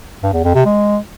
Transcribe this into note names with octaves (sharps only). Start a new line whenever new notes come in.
G2
E2
F2
C3
G#3